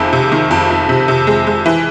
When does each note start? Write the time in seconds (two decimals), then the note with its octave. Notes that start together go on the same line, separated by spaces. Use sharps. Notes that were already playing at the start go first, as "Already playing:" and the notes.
Already playing: F2 C3 D#3 G#3
0.13 C3
0.32 D#3
0.51 F2
0.70 F2
0.89 C3
1.08 C3
1.27 G#3
1.47 G#3
1.66 E3